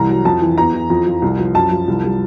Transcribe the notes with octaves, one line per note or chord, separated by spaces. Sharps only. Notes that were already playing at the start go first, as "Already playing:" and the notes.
Already playing: C2 E3 A#5
F#3
F2 A5
E3
E2 A#5
E3
F2
F3
C2
F3
F#2 A5
F3
C2
G3